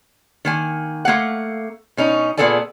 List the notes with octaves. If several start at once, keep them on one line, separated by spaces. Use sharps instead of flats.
D#3 A#3 G#5
A3 A#3 F5 F#5
B2 C#4 D#4
A#2 B3 G#4 A4 D5 G#5